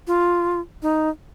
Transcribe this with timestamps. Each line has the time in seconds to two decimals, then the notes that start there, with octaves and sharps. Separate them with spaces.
0.07 F4
0.82 D#4